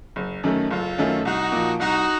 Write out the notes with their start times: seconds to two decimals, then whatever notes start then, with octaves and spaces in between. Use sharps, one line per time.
0.16 F#1
0.44 F#2 D#3 A3 C#4
0.71 F#1 F4 A4
0.98 F#2 D#3 A3 C#4
1.24 C2 D#4 F#4
1.52 A#2 F3
1.79 C2 D#4 F#4